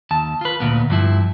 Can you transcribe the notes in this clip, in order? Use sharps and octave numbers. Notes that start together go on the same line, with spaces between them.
D#2 A5
F4 B4
D2 A#2 B3
G2 F3 E4